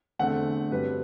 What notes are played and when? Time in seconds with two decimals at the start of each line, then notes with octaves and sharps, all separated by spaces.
0.19 E2 D3 A3 C4 F#5
0.71 G2 F#3 C4 B4